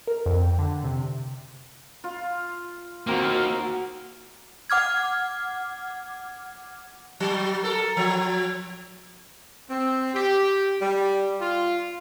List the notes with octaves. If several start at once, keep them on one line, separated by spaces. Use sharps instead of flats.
A#4
F2
G5
D3
C3
F4
D#3 A#3 C4 F#4 A#4
F#5 D6 F6 G#6
F#3
A4 A#4
F3
C4
G4
G3
F4